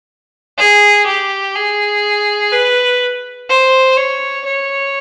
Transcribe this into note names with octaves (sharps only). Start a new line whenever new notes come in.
G#4
G4
G#4
B4
C5
C#5
C#5